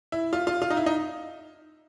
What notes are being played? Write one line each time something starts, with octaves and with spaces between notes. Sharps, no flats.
E4
F4
F4
F4
D#4
E4
D#4